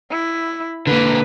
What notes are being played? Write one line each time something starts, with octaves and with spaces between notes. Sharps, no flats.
E4
D3 A#3 B4